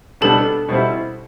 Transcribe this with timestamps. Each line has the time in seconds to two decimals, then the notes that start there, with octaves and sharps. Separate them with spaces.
0.21 B2 G3 B3 D4 A4 A5
0.69 B2 G3 C4 E4